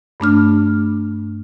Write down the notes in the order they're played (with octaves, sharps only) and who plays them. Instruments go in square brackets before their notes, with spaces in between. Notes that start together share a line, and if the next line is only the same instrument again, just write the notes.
[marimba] G2 A3 D4 F6